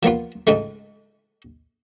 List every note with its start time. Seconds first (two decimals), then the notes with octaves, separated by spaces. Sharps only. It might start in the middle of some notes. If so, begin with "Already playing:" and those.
0.03 F3 A#3 B3 F4
0.47 C#2 G#2 G#3 A3